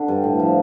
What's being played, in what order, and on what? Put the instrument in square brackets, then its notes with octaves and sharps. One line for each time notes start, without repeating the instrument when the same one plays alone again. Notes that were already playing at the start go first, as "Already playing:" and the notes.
Already playing: [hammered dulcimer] D3 D4
G2
A2
F3